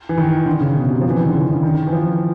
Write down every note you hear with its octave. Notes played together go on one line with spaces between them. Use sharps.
E3
D#3
D3
C#3
B2
C3
F3
E3
D#3
D3
C#3
D3
D#3
E3
F3